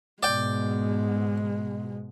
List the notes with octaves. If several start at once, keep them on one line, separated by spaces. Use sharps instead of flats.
G#2 B2 G#3 D5 G5